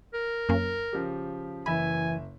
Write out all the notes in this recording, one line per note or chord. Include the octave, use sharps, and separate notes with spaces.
A#4
F#2 A#3 C#4
C#3 F3 G4
F#1 E3 E5 G#5 B5